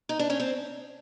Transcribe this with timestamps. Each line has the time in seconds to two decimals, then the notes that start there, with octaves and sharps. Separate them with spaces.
0.09 D#4
0.19 D4
0.30 C#4
0.40 C4